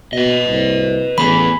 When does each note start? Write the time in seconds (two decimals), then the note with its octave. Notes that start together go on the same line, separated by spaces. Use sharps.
0.13 B2 B4 D#5
0.48 C2
1.18 A1 E3 B3 G#4 B5